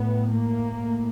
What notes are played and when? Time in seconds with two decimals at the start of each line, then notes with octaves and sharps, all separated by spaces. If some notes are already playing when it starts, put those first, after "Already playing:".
Already playing: A2 B3
0.33 A#3
0.76 A2